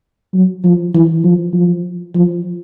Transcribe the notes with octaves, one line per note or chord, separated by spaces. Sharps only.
F#3
F3
E3
F3
F3
F3